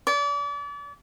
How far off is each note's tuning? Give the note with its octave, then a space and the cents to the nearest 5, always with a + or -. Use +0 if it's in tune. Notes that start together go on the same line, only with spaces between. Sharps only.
D5 -35